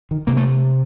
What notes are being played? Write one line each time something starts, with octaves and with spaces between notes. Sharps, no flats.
D#3
C3 A#3
A3